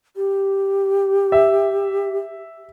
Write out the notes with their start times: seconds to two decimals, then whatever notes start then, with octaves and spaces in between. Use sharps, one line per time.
0.16 G4
1.32 E5